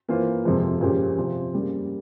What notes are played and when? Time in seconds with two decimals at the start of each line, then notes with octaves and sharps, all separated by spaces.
0.08 E3 A#3 F4 C5
0.45 F2 C3 F3 G#3
0.81 A#2 F3 G#3 C#4 G4
1.17 C3 F3 C4
1.53 C#3 G3 A#3